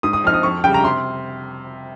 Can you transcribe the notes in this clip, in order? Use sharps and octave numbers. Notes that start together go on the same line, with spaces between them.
G#2 D#6
D#6
F3 C4 D#4 F6
D#6
F2 C#6
C#3 G3 G5
A#5
C3 C6